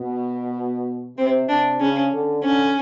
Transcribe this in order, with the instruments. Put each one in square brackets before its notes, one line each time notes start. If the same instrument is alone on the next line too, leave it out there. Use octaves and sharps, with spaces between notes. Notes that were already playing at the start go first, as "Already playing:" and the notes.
Already playing: [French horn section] B2
[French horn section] C3 [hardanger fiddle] C4
[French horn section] C3 [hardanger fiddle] D4
[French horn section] C#3 [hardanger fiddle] C#4
[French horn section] D3
[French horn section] D3 [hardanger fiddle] C#4